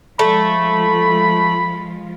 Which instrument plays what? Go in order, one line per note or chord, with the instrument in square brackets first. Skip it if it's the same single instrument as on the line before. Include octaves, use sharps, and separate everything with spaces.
[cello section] F3 G#3 F4 [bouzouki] A3 [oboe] B5